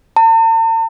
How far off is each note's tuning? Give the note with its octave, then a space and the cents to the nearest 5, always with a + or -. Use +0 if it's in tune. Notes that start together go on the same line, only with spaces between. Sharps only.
A5 +45